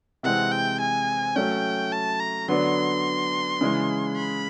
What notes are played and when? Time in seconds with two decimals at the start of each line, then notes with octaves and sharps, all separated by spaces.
0.23 C3 E3 G#3 C4 F#5
0.52 G5
0.80 G#5
1.36 F#3 A3 C#4 G5
1.92 A5
2.20 A#5
2.48 D3 F#3 B3 D4 C6
3.61 C#3 E3 G#3
4.16 B5